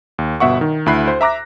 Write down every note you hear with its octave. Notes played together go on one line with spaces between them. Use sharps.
D#2
G1 B2 E5 F#5 C#6
D#3
D2 E4 B5 F#6 C7
C5
E5 A#5 D6 F#6 A#6